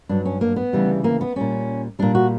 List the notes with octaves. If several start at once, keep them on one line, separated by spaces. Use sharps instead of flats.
G2 F#3 D4
C#4
A#3
B3
D2 C#3 E3 G3
A#3
B3
A#2 G3 C#4
A#2 G3 D4
F#4